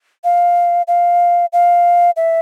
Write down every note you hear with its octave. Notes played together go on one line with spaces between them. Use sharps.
F5
F5
F5
E5